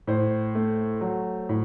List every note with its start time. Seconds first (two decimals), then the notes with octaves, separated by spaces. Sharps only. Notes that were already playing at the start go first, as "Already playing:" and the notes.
0.07 A2 C5
0.55 A3
1.01 F#3
1.49 A2